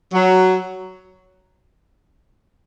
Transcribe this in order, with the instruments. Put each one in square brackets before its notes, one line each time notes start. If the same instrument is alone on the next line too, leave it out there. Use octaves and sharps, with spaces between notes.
[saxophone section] F#3